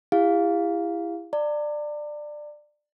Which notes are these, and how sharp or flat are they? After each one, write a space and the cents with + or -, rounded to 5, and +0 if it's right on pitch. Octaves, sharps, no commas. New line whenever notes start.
E4 +15 G4 +45 F5 +0
D5 +15 A#5 -40